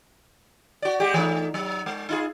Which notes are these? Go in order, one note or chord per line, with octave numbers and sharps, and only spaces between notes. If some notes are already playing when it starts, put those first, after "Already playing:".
F#4 D5
G#3 G4
E3 A3 D#4
F#3
G#3
D#4 F4 G#4